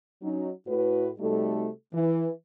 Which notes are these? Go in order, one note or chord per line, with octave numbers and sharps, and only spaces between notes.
F#3 C#4 D#4
A2 F#4 B4
C3 G3 A3 D#4 F#4 A4
E3